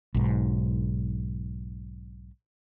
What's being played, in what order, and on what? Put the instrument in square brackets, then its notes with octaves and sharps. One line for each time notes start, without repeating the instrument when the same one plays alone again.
[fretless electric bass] B1 G#2